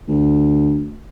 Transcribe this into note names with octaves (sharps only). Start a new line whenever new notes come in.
D2